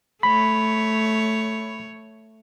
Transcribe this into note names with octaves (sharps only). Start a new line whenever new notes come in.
A3 C#5 B5